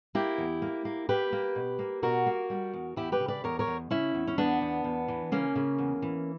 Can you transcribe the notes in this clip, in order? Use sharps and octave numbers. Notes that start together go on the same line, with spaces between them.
A#3 E4 G4
E2
A#3
A#3
A#3 G4 B4
A#3
B2
A#3
B2 F#4 A#4
A#3
G3
E2
E2 E4 G4
G4 B4
C#3
B4 D5
E2 A#4 C#5
A#4 C#5
E2
C#3 C#4 E4
E2
C#4
E2 B3 D4
E2
E2
E3
C#3 A#3 C#4
C#3
E2
E3